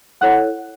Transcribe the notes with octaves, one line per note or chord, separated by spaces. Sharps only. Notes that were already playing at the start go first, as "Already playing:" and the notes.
E4 A4 C#5 F#5 F#6